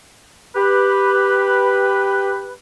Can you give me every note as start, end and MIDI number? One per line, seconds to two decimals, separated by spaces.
0.56 2.53 67
0.56 2.53 71